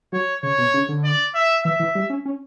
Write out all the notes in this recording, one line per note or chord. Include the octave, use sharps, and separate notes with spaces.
F#3 C#5
C#3 C#5
B2
C#3
D3
D5
E5
E3 E5
E3
G3
C#4
C#4